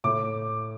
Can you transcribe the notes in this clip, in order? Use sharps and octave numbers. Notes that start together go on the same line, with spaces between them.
A2 A3 D6